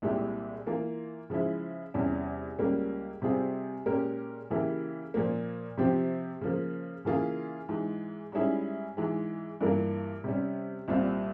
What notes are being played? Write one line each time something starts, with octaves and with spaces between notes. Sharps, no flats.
C2 A#2 G#3 E4 G4
E3 A#3 F4
C#3 F3 G#3 E4
E2 C3 G3 C#4
C#2 C#3 G3 A#3 C#4
C3 G3 C4 F4 G#4
A#2 G#3 C#4 G4 A#4
C#3 E3 A#3 E4 G4
A#2 F3 A#3
C3 F3 C4 G4
C#3 F3 A#3
C#3 E3 A#3 F4 G#4
G#2 E3 G#3
G#2 G3 C#4 E4 G#4
G#2 E3 G#3
G2 E3 A#3 F4 A#4
C3 G3 C#4
C2 A#2 G3 C4 F4